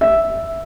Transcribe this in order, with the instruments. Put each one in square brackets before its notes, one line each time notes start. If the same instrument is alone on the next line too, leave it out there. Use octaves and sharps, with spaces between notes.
[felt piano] E5